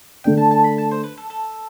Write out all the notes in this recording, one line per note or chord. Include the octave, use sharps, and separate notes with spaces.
D3 A3 D4 G5
A5
A5
B5
A5
C5
B4
A4
A4